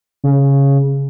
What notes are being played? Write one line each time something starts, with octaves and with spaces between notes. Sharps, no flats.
C#3